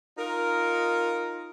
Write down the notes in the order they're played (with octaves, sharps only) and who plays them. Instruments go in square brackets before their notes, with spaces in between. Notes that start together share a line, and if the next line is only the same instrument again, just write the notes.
[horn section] D#4 F4 A#4